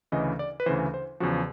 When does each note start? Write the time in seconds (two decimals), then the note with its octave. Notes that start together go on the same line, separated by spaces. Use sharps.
0.12 D2 C#3 E3 D#5
0.39 D5
0.60 B4
0.66 D2 C#3 E3 C5
0.94 C5
1.20 E2 C#3 F3 F#4